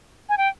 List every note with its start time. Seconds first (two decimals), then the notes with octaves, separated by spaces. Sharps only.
0.29 G#5
0.37 G5